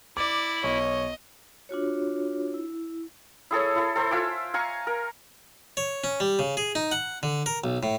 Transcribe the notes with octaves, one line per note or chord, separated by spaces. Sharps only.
E4 D5 D6
B1 C#5 D#5
D4 F4 F#4 C#5
E4
E4 G#4 A4 C#5
E4 A4
A4 C5 E5 D6
F4 E5 G#5 D6
F5 G#5 A#5 C#6
A#4
C#5
C#4
G3
C#3
G#4
D#4
F#5
D3
A#4
B1
A2